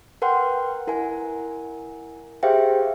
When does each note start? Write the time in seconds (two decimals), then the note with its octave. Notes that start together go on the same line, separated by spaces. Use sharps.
0.22 A#4 B4 F#5 G5 C6
0.87 E4 A#4 F#5 G#5
2.43 G4 G#4 C5 E5 F5 G5